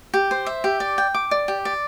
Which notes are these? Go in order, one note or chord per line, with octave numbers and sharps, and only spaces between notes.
G4
C5
E5
G4
D5
G5
D6
D5
G4
D5